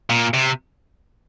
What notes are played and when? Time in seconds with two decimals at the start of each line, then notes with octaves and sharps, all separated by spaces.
0.10 A#2
0.34 C3